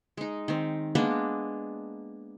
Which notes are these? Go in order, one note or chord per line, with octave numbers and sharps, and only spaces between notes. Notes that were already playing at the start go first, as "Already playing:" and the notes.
G#3 D#4
D#3 C4
G#3 A#3 B3 D4